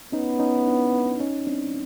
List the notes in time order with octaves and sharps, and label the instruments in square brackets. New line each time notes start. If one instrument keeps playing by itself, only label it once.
[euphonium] B3 [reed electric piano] C#4 D#4
[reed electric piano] C#4 D#4
D4 E4
C#4 D#4
C4 D4